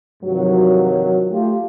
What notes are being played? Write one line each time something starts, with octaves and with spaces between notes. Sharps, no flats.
G2 C3 D#3 F3 F#3
A3 F4 G4